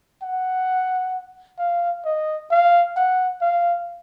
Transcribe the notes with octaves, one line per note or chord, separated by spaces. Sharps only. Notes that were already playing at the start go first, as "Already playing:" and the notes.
F#5
F5
D#5
F5
F#5
F5